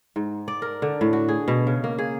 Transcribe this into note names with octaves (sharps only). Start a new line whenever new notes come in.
G#2
D5
A#4
D3
A2
F#4
G#4
B2
C#3
A#3
G#4